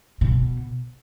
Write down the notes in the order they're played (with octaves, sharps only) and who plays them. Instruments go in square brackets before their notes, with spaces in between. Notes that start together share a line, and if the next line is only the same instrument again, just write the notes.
[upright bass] B2